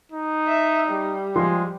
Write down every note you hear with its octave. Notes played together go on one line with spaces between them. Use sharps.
D#4
E5
G3
F3 G#3 C6